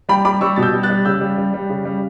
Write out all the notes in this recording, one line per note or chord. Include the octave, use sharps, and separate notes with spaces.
G3 G5 B5
G3 B5 D6
G3 C#6 E6
B2 A6
E6 G6
G3
F#6 A6
G3
C#3 E6 G6
G3
G3
G3
C#3
G3